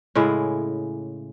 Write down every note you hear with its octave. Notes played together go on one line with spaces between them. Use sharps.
A2 C#3 G#3 E4